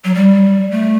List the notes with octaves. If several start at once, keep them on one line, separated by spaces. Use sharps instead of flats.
F#3
G3
A3